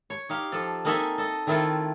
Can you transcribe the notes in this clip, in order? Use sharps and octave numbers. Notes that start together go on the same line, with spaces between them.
C#5
D#4 G4 F5
F3 A4
A#3 C4 D#4 A4 E5 G#5
A4 D#5
D#3 A3 C4 E4 F4 A4